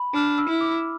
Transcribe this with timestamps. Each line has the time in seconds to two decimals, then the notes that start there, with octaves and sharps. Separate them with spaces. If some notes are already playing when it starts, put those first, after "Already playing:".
Already playing: B5
0.14 D4 F6
0.38 E6
0.49 E4
0.61 D6